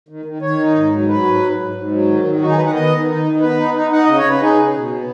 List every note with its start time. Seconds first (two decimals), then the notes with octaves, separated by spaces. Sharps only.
0.08 D#3
0.25 D#3
0.42 D#3 C#5
0.58 D#4
0.75 G#2
0.92 F#3
1.08 F#3 B4
1.25 G#2
1.42 G#2
1.59 G#2
1.75 G#2
1.91 F#3
2.08 D#3
2.24 D#3
2.41 D#4 F#4
2.50 G#4
2.57 D#3 B4
2.66 F#5
2.74 B3 D#5
2.92 D#3
3.08 D#4
3.25 D#3
3.40 B3 B4
3.58 D#4
3.74 D#4
3.90 D#4 F#5
4.04 C#3 D#5
4.17 C#5
4.24 C#3
4.29 B4
4.40 D#4 G#4
4.57 C#3
4.74 B2
4.90 B3